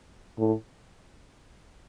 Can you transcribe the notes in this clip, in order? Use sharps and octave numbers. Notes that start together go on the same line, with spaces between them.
A2